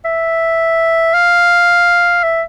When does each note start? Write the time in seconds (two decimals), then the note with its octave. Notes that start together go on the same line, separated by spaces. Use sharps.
0.05 E5
1.14 F5
2.23 E5